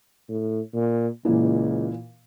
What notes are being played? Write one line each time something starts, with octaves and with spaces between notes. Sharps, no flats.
A2
A#2
C#2 A#2 E3 A#3